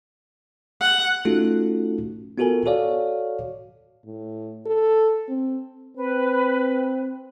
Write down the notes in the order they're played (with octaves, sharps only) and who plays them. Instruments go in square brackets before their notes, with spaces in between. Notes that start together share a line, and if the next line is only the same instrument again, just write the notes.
[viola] F#5
[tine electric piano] A3 C#4 D#4 F4 F#4 A4
B3 F4 F#4 A4 A#4 G#5
F#4 A4 C#5 D5 F5
[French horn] A2
A4
C4
[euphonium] C4 [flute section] B4